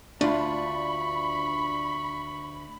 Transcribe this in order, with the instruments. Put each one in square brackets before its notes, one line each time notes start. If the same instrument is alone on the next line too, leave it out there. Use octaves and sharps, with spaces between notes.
[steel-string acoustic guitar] D2 [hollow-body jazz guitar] D4 F4 [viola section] B5 [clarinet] C#6